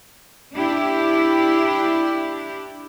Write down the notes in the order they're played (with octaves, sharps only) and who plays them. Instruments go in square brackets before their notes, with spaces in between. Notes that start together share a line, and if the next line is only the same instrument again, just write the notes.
[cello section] D4 E4 G4